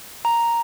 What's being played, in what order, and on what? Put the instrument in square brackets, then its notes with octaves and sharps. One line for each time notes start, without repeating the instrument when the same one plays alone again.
[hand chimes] A#5